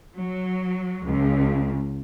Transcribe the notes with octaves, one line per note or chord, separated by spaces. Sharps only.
F#3
C#2